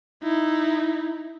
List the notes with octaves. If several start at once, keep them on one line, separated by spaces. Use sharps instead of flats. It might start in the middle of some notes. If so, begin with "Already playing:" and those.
D#4 E4